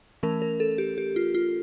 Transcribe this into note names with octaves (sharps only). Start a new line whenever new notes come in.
E3 A3 C#4 A#4
A#4
A4
G4
G4
F4
F4